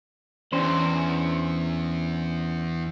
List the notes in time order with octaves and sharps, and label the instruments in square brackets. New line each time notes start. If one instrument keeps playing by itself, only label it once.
[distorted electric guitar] E2 [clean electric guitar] C#4 D4 C5